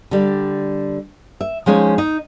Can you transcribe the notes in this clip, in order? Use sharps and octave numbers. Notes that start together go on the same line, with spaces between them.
D3 G3
E5
F3 G#3 C#4 D#4
D#4